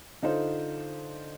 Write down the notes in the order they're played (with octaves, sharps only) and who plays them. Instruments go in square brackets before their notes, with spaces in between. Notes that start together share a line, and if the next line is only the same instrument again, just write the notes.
[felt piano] D3 D#4 F4 C5